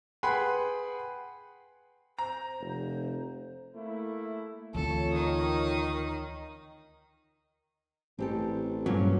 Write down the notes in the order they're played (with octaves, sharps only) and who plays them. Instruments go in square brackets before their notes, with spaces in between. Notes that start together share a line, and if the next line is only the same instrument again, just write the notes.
[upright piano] G#4 B4 F#5 G5 B5 C6
[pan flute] C5 [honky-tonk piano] A#5
[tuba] F1
[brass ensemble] A3 A#3 E4
[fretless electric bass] D2 E3 C4 [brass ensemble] F4 C#5 [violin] A4
[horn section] D#3 [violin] D#4 D#6
[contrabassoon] A1 [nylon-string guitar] C4 G4 A4
[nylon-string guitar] G2 A#2 C#4 [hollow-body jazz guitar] F#3